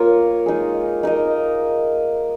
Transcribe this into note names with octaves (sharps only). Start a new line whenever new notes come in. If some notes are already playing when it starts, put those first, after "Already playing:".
Already playing: A#3 F4 A#4 C#5
G#3 D#4 G#4
D#4 A#4 D#5